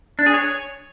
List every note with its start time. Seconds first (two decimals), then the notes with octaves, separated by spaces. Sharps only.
0.19 D4
0.26 G#4
0.34 C#5